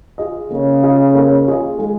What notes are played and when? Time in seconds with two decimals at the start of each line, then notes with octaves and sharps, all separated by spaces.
0.18 F4 G#4 D#5
0.51 C#3 A#3
0.83 F4 G#4 D#5
1.15 A#3
1.47 F4 G#4 D#5
1.79 G#3